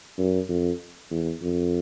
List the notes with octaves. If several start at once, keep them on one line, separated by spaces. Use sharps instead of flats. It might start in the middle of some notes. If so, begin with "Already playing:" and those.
F#2
F2
E2
F2